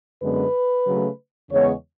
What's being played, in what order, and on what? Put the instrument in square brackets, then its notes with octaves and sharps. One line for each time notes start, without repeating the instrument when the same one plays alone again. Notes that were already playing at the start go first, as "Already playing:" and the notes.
[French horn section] F#2 D3 G#3 B3 B4
C#3 F#3 A3
E2 C#3 G#3 B3 C#5